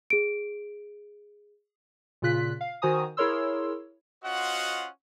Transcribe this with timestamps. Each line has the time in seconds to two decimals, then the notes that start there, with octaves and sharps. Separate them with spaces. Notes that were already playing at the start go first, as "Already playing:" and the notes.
0.10 G#4 D7
2.22 A#2 C#3 F4 F#6 B6
2.61 F5
2.82 D#3 F#4 C5 G#5 A#5 D#6
3.17 E4 G#4 A#4 C#5 C6 E6
4.25 C#4 F4 F#4 C5 D#5 F#5